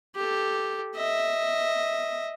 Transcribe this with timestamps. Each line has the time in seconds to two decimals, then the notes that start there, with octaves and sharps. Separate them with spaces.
0.16 G4 A4
0.95 D#5 E5